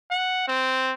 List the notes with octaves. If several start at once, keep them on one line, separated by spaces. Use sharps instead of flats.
F#5
C4